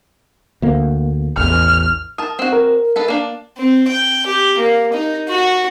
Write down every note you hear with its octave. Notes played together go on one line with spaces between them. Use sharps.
D2 A#3
A1 E2 F6
A#4 A5 D#6
C4 F#4
A#4
G#3 A4 B4
A#3 D4
C4
G5
G4
A#3
D#4
F#4